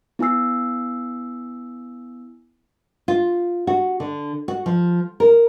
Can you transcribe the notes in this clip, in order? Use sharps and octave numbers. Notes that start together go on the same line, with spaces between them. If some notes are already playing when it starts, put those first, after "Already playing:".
B3 E4 G#5 E6 C7
F4
F#4
D3
F#4
F3
A#4